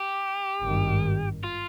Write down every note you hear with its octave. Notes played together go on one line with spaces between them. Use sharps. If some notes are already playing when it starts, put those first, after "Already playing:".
Already playing: G4
G#1 G2 D#3
F4